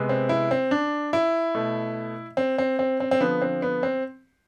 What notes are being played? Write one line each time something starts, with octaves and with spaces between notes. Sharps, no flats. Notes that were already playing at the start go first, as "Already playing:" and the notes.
Already playing: C3 G#3 B3
C4
E4
C4
D4
E4
B2 A3
C4
C4
C4
C4
C4
D3 F3 B3
C4
B3
C4